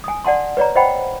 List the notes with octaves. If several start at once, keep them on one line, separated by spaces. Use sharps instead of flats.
G#5 D#6
D5 F#5 A5 C6
B4 C#5 D5 A#5
C5 D#5 F#5 G5 B5